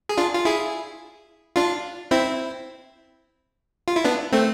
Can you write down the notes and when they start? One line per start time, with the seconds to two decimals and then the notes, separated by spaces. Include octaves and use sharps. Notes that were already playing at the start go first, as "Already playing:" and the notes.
0.09 G#4
0.18 D4 F4
0.35 F4
0.45 E4 G#4
1.56 D4 F4
2.11 C4 E4
3.88 F4
3.96 E4
4.04 B3 D4
4.32 A3 C4